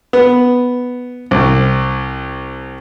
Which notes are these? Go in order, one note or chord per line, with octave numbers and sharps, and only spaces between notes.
B3
C2